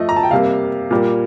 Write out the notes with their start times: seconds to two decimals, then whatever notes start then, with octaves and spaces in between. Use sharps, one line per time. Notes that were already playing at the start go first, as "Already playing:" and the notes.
Already playing: F3 A3 D#5
0.09 A#5
0.16 A5
0.23 G5
0.31 C3 G3 A#3 F5
0.91 A#2 G3 A#3